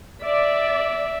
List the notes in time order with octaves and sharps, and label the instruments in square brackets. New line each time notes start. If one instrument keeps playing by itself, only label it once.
[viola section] D5 [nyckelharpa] E5